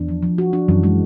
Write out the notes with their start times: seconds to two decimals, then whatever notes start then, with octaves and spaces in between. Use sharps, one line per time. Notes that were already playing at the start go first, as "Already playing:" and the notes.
Already playing: E2 D4
0.08 F3
0.23 F3
0.38 F#4
0.53 D4
0.68 F#2 E3
0.83 G#3